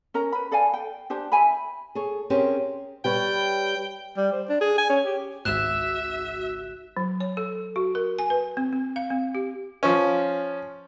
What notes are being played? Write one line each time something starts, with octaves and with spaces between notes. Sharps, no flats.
C#4 A#4 A#5
B4 B5
A4 D5 F5 G#5
G5
D4 G4 C5 A5
E5 G#5 B5
G#4 A4 C#5
C4 C#4 G4 G#4 A#4 C5
G3 B4 C#5 G5
G3
C5
D4
G#4
G#5
C#4
G4
G#1 C#2 G#2 F#4 E5 F#6 E7
F#3
C#5
A4
F#4
A#4
G#5
B4
C4
C4
F5
C4
G4
F3 C#4